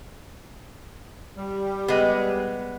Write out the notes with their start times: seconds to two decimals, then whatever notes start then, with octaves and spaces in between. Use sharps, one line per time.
1.38 G3
1.88 G#3 B3